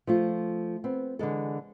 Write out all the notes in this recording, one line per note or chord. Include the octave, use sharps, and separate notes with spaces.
F3 A3 F4
B3 C4
D3 E3 G#3 A4